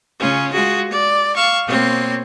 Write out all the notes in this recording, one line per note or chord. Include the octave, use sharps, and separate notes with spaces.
C#3 C#4 F4
G#3 F4 F#4 G#4
D5
F5 C#6 E6
B2 A#3 C4 C#5 C6